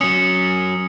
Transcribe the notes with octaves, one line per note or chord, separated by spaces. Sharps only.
F#3 C#4 D#6 C#7